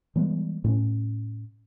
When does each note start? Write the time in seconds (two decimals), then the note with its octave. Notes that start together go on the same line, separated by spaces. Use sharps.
0.16 E3 G3 G#3 B3
0.64 A2 C4 C#4